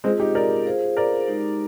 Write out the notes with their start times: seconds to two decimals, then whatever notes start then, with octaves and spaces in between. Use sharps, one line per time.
0.04 G#3 C4 F4 G#4 D#5
0.20 D#4 G4
0.35 A#4 D5
0.66 F4 G#4 C5 F5
0.97 A#4 D5
1.27 G#3 D#4 G4